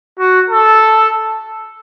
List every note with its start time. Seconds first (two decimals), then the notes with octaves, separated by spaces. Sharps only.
0.19 F#4
0.50 A4